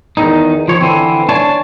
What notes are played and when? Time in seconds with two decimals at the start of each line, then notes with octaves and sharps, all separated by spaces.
0.17 E2 D#3 D#4
0.68 F3 C#5
0.81 D3 E3 C4
1.29 D4 C#5 G#5 A5